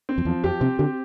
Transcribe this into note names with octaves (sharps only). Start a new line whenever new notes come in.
C4
F2
E2 F3
F2 G4
C3 C4
D3 G4